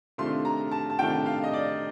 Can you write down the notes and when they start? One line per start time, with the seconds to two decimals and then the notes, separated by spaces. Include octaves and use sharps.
0.18 C3 D#3 A3 D4 F4 C6
0.45 A#5
0.71 A5
0.90 A5
0.99 C3 D#3 A3 D4 F4 G5
1.26 F5
1.44 D#5
1.53 D5